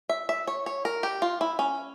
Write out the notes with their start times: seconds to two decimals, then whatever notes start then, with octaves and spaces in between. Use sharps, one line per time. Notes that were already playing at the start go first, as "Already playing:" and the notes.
0.09 E5
0.29 E5
0.48 C#5
0.66 C#5
0.85 A#4
1.03 G4
1.22 F4
1.41 E4
1.59 C#4